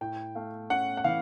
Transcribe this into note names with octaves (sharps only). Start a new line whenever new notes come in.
A2 G5
A3 F5
C#4 F#5
F#5
E3 F5